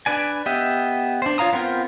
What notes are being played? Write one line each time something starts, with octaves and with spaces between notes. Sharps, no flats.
D4 B4 D5 G#5
B3 G4 D#5 E5
D4 C5
F4 C#5 F5 A#5 D#6
B3 C4 F4 A#4 C5